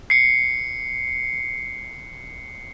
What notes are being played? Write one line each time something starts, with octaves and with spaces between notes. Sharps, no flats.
C7 C#7